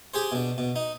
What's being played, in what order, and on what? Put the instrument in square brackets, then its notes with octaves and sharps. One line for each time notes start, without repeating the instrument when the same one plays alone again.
[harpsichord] G4 G#4 C5
B2 D4
B2
D#4